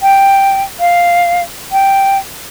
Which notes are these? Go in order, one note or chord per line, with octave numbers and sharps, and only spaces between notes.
G5
F5
G5